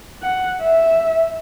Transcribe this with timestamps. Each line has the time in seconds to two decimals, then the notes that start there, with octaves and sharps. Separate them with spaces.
0.22 F#5
0.62 E5